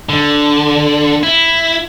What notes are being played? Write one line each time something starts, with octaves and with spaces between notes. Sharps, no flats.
D3
E4